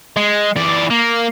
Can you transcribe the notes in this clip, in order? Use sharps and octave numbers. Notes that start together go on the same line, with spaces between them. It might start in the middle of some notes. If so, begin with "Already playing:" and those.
G#3
E3 D5
A#3